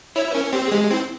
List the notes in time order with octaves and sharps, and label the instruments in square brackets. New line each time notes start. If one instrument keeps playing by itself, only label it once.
[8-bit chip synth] E4 [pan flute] C#5
[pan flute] C5
[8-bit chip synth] C#4 [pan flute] A#4
[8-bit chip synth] C4 [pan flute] G4
[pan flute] G#4
[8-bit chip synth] G#3 [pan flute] G4
[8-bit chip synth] C4 [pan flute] E4